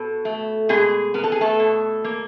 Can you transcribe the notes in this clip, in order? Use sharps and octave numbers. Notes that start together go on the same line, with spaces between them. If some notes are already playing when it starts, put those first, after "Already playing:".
Already playing: B2 A4
A3
B2 G#3 G#4
B3 A#4
A4
G#4
A3 A4
B2
A#3